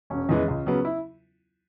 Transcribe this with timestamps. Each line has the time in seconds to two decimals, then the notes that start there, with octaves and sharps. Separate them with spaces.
0.10 E1 C#4
0.29 E2 E3 G#3
0.48 C#2
0.66 C#3 F#3 B3
0.85 E4